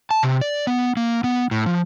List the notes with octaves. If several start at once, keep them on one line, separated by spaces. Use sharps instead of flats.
A5
C3
D5
B3
A#3
B3
A2
F3